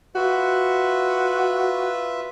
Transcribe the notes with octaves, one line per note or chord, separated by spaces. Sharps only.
F4 F#4 B4 E5